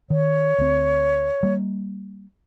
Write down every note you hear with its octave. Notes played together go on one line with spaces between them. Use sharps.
D#3 C#5
D2 C4
G3 A#3